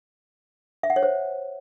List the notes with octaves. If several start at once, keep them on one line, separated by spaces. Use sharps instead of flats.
E5
F#5
C#5
C5